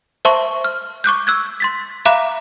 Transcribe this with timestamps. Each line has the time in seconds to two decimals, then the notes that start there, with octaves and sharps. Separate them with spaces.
0.25 C5 E5 A5 C6 C#6
0.64 F6
1.04 C#6 D6 F#6 G6
1.27 E6 F#6 G#6
1.60 C6 A6 B6
2.05 E5 F5 A#5 B5 D6 F#6